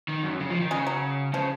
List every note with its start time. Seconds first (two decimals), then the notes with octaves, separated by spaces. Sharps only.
0.08 D#3
0.23 F#2
0.40 C#3
0.50 F3
0.61 D#3
0.71 C#3 G#3
0.87 F#3
1.34 C#3 F3